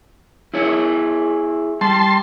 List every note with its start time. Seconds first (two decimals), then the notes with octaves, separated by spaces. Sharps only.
0.54 E4 G#4 C#5
1.81 G3 A5 C6